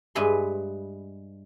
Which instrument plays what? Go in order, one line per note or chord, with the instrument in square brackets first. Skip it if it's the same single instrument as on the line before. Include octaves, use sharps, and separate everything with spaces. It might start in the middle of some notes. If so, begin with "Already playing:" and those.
[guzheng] G2 G#3 B4 E5 C6